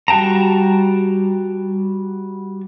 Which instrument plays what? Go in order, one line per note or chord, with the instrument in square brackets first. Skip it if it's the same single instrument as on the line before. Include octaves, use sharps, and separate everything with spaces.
[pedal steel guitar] G3 F#4 G5 A5 A#5